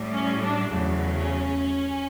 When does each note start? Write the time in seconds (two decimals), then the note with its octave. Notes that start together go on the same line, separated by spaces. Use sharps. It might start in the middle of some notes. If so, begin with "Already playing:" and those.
Already playing: A2 G3
0.13 C#4
0.42 D4
0.71 E2 C#3 F#3 A3
1.15 C#4